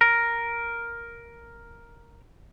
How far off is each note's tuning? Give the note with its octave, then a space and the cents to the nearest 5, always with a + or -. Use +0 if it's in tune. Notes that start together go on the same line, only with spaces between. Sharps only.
A#4 +5